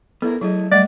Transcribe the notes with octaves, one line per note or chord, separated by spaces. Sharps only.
B3 E4 A4 A#4
F#3 A3 E4 G#4 D#5
G3 A3 D5 D#5 F#5